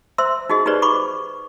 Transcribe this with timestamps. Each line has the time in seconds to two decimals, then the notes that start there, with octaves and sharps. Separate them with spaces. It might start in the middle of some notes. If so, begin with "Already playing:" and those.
0.18 C5 E5 C6 E6
0.50 D#4 F#4 G#4 D#5
0.66 D#4 G4 G#4 B4 C5 D5
0.82 B5 C#6 D6